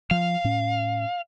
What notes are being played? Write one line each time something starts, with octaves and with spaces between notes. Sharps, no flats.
F3 F5
A2 C#4